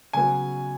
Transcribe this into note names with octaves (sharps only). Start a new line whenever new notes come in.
C#3 F#3 B3 G#5